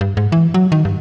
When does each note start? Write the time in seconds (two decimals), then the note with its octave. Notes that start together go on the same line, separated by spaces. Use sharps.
0.01 G2
0.17 G#2
0.32 E3
0.54 F#3
0.72 D#3
0.85 G2